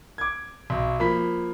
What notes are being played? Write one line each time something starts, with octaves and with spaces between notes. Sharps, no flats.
D6 G#6
B1
F3 A#3 B5 B6